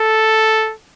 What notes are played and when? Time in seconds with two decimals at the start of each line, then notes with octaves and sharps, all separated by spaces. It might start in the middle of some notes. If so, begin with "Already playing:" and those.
Already playing: A4